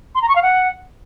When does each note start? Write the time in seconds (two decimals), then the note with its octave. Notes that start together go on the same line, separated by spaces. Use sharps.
0.15 C6
0.22 A#5
0.29 C#6
0.35 F5
0.42 F#5